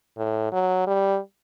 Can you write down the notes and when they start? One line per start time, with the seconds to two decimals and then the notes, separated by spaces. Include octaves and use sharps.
0.18 A2
0.52 F#3
0.87 G3